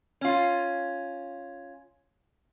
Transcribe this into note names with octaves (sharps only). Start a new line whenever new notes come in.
C#4 F4